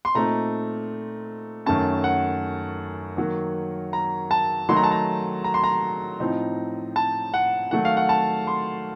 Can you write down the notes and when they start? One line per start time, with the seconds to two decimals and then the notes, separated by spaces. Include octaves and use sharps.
0.05 C6
0.14 A#2 A3 C4 D#4 A#5
1.66 F#2 D#3 A3 C#4 A5
2.04 F#5
3.17 D#3 F#3 A#3
3.93 A#5
4.31 A5
4.69 D#3 F#3 A3 D#4 C6
4.76 A#5
4.84 A5
4.91 A#5
5.44 A#5
5.54 C6
5.64 A#5
6.20 A2 F3 C4 D#4
6.96 A5
7.34 F#5
7.71 D#3 F#3 A3 F#5
7.85 F5
7.97 F#5
8.09 A5
8.47 C6